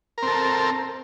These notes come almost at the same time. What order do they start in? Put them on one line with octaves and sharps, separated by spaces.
A#4 C4 A4